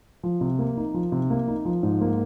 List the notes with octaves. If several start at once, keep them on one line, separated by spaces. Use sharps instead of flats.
F3
C3
A#3
D#4
F3
C3
A#3
D#4
F3
G#2
A#3